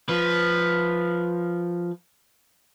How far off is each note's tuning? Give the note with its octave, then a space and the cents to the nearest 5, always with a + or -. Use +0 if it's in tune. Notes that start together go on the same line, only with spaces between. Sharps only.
F3 +0 B4 +0